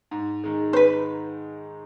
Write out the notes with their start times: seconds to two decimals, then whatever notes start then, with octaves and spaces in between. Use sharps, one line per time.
0.11 G#2
0.44 D#3 G#3
0.73 C5
0.76 B4